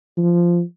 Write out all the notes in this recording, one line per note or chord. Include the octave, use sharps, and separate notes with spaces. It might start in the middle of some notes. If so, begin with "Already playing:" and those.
F3